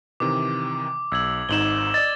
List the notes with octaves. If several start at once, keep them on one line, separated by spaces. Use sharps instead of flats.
C3 D#3 E3 D6
B1 E6 G#6 F#7
G#1 G#2 D#4 E7 F#7 G7
D5 D#5 A6